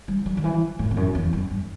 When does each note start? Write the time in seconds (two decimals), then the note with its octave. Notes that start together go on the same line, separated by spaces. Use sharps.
0.08 G3
0.26 F#3
0.37 D3
0.44 E3
0.79 A2
0.91 E2
0.97 F#2
1.15 E2
1.33 F#2
1.50 G2